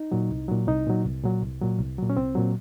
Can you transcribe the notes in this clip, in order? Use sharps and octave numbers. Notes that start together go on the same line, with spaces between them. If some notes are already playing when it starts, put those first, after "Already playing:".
Already playing: D#4
A#2 F#3
C2
A#2 F#3
C2 D#4
A#2 F#3
C2
A#2 F#3
C2
A#2 F#3
C2
A#2 F#3
C#4
C2 C4
A#2 F#3